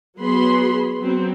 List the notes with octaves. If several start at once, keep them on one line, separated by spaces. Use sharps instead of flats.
F#3 B3 F#4 G#4 B5 C6
F#3 B3 C4